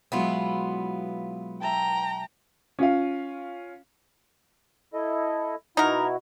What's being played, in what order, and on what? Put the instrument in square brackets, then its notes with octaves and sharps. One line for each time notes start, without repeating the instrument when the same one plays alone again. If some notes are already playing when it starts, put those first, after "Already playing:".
[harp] B2 F#3 G#3 [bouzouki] B3 E4 F4
[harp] E5 A5 [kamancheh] G5 A#5
[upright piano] C#4 F4 F5
[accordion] E4 A4 D#5
[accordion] B2 E4 F#4 [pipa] D#4 A#4